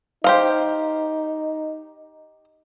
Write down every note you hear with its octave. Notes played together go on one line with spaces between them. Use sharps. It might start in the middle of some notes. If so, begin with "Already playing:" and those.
D#4 G4 C5 F5